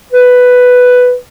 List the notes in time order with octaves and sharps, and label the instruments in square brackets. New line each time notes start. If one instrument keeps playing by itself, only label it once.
[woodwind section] B4